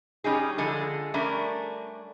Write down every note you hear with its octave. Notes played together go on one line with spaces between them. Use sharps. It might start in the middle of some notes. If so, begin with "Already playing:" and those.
G3 C#4 D#4 G#4
D3 F3 G#3 G#4 A4
G3 A3 C#4 D4 A#4